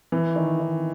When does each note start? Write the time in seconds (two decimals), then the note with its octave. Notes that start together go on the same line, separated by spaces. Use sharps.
0.12 E3
0.36 D#3
0.60 D#3